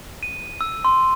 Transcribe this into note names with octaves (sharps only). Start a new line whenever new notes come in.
D#7
E6
C6